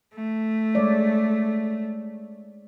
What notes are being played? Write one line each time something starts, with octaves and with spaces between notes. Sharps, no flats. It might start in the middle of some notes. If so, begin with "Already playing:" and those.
A3
G#3 C#5 D5